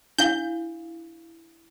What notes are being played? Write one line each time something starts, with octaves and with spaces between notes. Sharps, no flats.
D4 E4 F5 G6